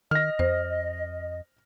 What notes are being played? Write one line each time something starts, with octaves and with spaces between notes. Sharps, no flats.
D#3 D#5 F6 A#6
F2 C5